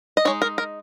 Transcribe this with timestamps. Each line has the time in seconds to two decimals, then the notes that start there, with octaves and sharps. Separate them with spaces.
0.17 D#5
0.25 G#3 D#4 C#5
0.42 A#4
0.58 A#4